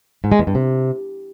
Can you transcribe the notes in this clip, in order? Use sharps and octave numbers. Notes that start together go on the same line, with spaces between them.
G#2
G#3
E2
G2
C3